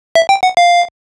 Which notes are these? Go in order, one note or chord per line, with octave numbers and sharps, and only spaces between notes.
E5
G5
F#5
F5